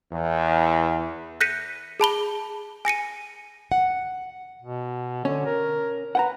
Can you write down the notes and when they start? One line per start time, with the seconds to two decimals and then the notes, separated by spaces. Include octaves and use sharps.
0.12 E2
1.41 F#6 G6 A#6 B6 C#7 D#7
2.00 G#4 A5 B5 G7
2.85 G#5 A#6 C#7 D#7
3.72 F#5
4.62 B2
5.25 D3 C#4
5.46 A#4
6.15 B4 F#5 G5 A#5